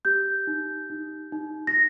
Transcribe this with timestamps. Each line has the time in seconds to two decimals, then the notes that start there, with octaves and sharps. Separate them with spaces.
0.05 G4 G6
0.47 D#4
0.90 D#4
1.32 D#4
1.67 A#6